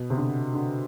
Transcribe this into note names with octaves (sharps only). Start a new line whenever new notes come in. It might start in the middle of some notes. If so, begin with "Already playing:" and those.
Already playing: B2
C3
D3
D3